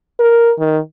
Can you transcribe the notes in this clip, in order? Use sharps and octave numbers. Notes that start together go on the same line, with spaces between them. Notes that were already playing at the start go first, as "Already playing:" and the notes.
A#4
D#3